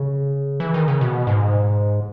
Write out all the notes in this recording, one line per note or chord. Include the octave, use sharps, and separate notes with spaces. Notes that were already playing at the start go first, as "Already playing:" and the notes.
Already playing: C#3
E3
D#3
C#3
B2
G#2